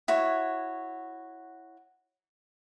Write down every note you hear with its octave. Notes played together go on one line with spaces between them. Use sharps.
E4 F#4 C#5